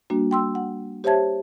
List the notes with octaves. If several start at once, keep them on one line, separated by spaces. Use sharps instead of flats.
G3 A#3 D4 F#4
G5 C6 E6
F#5
G4 C5 C#5 E5 A5 G#6